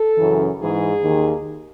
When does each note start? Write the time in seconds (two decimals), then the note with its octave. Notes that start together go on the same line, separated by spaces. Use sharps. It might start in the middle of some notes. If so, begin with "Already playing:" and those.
Already playing: A4
0.18 F#2 C#3 E3
0.59 G#2 E3 G#4
1.01 D#2 D#3